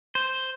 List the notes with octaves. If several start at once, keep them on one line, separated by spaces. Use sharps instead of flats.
C5